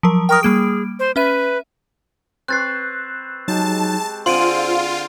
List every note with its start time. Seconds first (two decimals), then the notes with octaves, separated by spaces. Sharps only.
0.03 F3 F#3 A#4
0.29 A#4 G5 C#6 D#6
0.43 G3 A#3 G#4 D7
0.99 C5
1.16 C#4 B4 E5 D#7
2.48 C4 B4 C#6 F#6 A6 C7
3.48 F#3 G#3 D#4 G4 A5
4.26 D3 C4 F4 G#4 C5 C6 D7 D#7